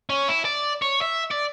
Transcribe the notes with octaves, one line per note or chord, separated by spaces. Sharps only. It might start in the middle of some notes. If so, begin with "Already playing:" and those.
C#4
E4
D5
C#5
E5
D5